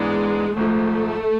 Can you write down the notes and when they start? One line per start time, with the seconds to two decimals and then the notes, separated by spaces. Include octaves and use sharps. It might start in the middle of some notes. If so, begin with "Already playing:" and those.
Already playing: G#2 E3 G#3 B3 D4
0.57 G#1 G#2 F3 A3